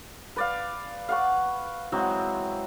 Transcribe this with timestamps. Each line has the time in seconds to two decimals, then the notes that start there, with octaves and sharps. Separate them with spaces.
0.36 B4 D5 F5
1.08 F5 F#5 C#6
1.92 E3 F#3 G#3 C4